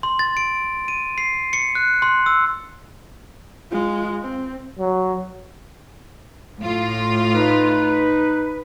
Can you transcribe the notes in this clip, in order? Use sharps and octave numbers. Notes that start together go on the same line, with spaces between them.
C6
A6
D7
D#7
C7
C#7
F#6
C6
E6
G#3 F4
C4
F#3
A2 F4
D#4 B4